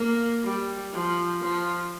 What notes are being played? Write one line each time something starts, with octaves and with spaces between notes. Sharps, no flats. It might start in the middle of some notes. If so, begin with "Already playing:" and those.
Already playing: A#3
G3
F3
F3